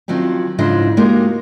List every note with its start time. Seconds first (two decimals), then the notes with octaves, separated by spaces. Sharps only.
0.08 D#3 F3 F#3 C4 C#4
0.58 G#2 C#3 F3 D4 E4 D#5
0.97 G#3 A#3 D#4 F#4 G4 A#4